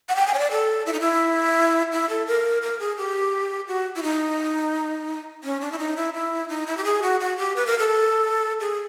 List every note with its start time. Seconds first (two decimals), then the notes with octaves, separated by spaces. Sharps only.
0.09 F#5
0.16 G5
0.27 G#5
0.34 C#5
0.39 D5
0.51 A4
0.86 E4
0.93 D#4
1.00 E4
1.92 E4
2.09 A4
2.27 A#4
2.62 A#4
2.80 G#4
2.97 G4
3.68 F#4
3.96 E4
4.03 D#4
5.44 C#4
5.61 D4
5.72 E4
5.79 D#4
5.97 E4
6.14 E4
6.49 D#4
6.67 E4
6.77 G4
6.85 G#4
7.02 F#4
7.20 F#4
7.37 G4
7.56 B4
7.66 A#4
7.79 A4
8.60 G#4